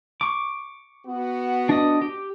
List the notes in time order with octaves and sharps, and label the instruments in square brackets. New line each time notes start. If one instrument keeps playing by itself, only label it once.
[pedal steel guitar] C#6 D6
[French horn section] B3 F#4
[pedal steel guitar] D4 D#5
G4